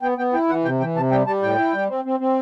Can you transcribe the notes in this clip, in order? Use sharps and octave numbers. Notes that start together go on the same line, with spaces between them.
B3 G5
B3 G5
E4 G5
E3 F#5
C3 G5
E3 G5
C3 A5
G3 G5
G3 A5
A2 G5
E4
G3
C4
C4
C4